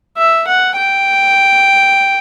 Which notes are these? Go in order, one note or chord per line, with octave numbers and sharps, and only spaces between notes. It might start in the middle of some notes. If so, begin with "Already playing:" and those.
E5
F#5
G5